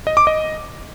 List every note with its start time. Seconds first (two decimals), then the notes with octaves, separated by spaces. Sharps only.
0.07 D#5
0.17 D6
0.27 D#5